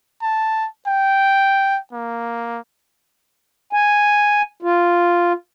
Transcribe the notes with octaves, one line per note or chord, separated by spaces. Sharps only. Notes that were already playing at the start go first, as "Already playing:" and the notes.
A5
G5
A#3
G#5
F4